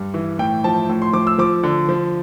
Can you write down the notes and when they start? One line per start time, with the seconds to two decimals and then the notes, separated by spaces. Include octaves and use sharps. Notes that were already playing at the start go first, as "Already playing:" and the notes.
Already playing: G2
0.14 E3
0.39 A2 G5
0.64 F3 A5
0.89 A2
1.02 C6
1.13 F3 D6
1.27 E6
1.38 F3 D6
1.63 D3
1.89 F3